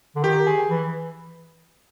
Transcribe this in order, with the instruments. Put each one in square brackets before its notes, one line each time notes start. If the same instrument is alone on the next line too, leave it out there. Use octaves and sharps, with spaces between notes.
[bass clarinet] D3
[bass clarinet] D#3 [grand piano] G4
[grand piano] G#4
[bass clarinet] E3